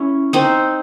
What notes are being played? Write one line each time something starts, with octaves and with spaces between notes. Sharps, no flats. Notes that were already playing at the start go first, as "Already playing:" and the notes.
Already playing: C#4 E4
C4 D#4